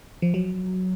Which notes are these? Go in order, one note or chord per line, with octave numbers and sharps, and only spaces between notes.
F3
F#3